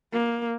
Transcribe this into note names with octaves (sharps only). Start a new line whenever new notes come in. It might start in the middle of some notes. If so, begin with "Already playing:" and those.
A#3